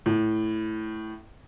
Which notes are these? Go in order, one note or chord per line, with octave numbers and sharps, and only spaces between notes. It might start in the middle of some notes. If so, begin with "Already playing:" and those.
A2